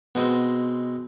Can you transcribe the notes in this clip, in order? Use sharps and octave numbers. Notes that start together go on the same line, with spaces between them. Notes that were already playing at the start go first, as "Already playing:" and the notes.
B2 G#3 B3 C4 D#5